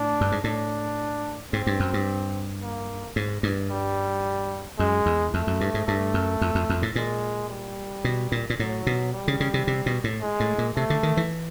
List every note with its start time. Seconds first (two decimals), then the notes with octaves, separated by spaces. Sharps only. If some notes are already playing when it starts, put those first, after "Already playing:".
Already playing: A2 D4
0.21 G2
0.32 G#2
0.44 A2 D4
1.53 G#2 C4
1.67 G2
1.80 F#2
1.94 G2
2.61 A#3
3.16 G#2
3.43 G2
3.70 G3
4.79 F#2 G#3
5.06 E2
5.34 F2 A3
5.47 F#2
5.61 G2
5.74 G#2
5.87 G2 A3
6.14 F#2
6.41 F2
6.55 F2
6.70 F2
6.82 A2
6.96 A#2 G#3
7.50 G3
8.04 B2
8.32 A#2
8.50 A#2
8.59 A2 F#3
8.87 B2
9.13 G3
9.28 C#3
9.40 C#3
9.54 C3
9.67 C3
9.86 B2
10.04 A2
10.22 G#3
10.40 A2
10.58 A#2
10.76 C3 A3
10.90 D3
11.03 D#3
11.17 E3